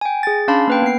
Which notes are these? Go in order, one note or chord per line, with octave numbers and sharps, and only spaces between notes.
G5 G#5
G#4 A6
C#4 D4 F5 A5 B5 C6
A#3 B4 G5
B3 C7